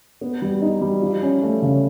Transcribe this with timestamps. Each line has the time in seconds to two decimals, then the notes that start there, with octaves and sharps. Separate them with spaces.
0.21 B3
0.42 G3
0.62 D#4
0.81 G3
1.02 F3
1.22 C#4
1.42 A3
1.62 C#3